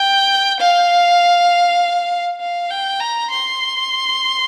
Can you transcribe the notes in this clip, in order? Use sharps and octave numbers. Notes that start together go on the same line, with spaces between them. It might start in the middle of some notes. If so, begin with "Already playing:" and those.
Already playing: G5
F5
F5
G5
A#5
C6